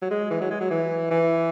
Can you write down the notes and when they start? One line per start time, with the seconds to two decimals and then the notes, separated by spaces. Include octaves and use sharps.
0.02 F#3
0.11 G#3
0.31 E3
0.41 F#3
0.51 G#3
0.61 F#3
0.71 E3
1.11 E3